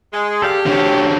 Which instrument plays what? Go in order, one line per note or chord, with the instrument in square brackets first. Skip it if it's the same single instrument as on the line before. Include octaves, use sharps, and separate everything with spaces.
[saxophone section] G#3
[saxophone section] G4 [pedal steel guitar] A4 D5 F5
[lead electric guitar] D3 C#4 [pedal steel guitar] C4 F#4